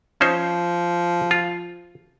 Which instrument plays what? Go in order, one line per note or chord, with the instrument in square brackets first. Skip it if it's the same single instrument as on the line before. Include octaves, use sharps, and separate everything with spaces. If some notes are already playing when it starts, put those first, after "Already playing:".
[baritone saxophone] F3 [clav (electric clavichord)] C#4 D#4 C5
[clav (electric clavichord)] F4